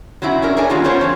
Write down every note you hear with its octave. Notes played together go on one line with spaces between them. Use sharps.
F#3 C4 C#4 E4
C#4 D4 A#4
G#4 A#4 C#5 D5 G#5 A5
D#3 F#3 G3 A#3 C#4 F4
B3 C#4 F4 A#4 C5 C#5
F3 C4 C#4